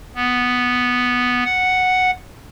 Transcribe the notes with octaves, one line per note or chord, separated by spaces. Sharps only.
B3
F#5